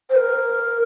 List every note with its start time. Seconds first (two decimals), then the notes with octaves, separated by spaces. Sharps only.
0.10 C5
0.16 A#4